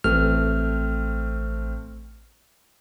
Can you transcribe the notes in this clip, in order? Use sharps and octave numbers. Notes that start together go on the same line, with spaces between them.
A1 A3 C4 F6